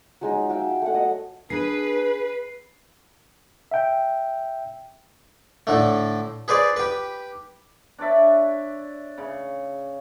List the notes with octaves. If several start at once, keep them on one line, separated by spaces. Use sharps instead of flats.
F#3 G#3 D#4
F#4 E5 F5 G5
A3 F#5
F#3 D#5
D4 G#4 B4 C7
E5 G5
A2 D3 A3
G#4 B4 C5 D5
G4 B4
D4 C#5 D5 E5
C#3